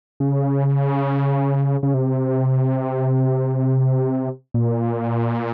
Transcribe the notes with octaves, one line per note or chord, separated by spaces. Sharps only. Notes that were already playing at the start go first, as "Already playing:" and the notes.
C#3
C#3
C3
A#2